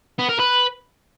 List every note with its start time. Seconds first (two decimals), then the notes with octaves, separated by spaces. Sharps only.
0.19 B3
0.29 A#4
0.39 B4